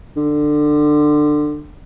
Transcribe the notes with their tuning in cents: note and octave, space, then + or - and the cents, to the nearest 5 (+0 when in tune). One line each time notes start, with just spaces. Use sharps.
D3 +20